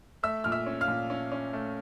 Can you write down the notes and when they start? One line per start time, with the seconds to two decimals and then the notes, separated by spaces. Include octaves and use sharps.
0.23 A3 E5 E6
0.44 A#2 F6
0.52 E5 E6
0.66 C#4
0.81 F5 F6
0.88 A#2
1.10 C#4
1.32 C#4
1.53 A3